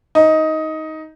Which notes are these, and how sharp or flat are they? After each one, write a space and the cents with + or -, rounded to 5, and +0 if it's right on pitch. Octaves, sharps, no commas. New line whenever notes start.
D#4 +15